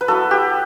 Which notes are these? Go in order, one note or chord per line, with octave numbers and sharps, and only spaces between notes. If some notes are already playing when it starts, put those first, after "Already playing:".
B4
F#3 B3 E4 A4
G4